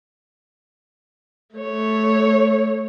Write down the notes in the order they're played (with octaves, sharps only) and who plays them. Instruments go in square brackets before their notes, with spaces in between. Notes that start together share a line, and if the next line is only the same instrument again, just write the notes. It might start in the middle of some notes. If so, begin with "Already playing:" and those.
[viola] A3 C#5